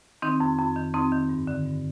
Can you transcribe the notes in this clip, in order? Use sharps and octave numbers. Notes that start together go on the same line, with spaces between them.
D#3 C4 D#4
F2
F2
D#3
F2 C4 D#4
D#3
G2
D3
G2